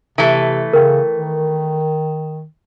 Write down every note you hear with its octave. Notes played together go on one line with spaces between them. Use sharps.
C3 E3 A3
C#3 A#4 G5
D#3